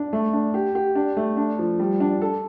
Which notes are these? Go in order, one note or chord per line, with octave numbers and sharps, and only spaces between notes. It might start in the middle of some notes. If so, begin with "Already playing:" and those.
Already playing: D4
A3
D4
G4
G4
D4
A3
D4
F3
G3
D4
A4